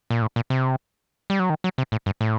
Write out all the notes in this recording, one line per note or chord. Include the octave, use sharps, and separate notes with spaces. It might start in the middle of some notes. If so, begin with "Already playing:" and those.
A#2
A2
A#2
C3
G3
F#3
D#3
F#3
C3
A2
G2
A2